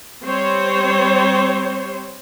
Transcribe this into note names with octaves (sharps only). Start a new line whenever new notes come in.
G3 C4 C5 C#5